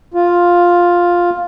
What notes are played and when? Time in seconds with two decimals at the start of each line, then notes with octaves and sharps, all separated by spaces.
0.14 F4